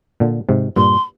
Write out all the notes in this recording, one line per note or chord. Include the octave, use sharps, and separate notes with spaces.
A#2 D3
G#2 C3
G2 A#2 C6